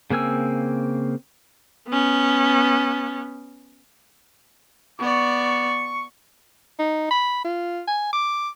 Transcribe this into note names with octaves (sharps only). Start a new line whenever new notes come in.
C#3 A#3 C4 G#5 E6
B3 C#4
B3 D5 C#6
D#4
B5
F4
G#5
D6